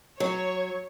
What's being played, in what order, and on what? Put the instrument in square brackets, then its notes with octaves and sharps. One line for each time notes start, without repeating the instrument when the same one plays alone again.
[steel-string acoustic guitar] F#3 [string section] C#5